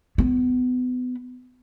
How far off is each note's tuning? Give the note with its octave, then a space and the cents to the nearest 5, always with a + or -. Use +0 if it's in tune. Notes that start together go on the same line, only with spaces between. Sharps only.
B3 +25